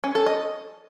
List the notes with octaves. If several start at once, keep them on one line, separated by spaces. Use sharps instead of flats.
C#4
A4
D#5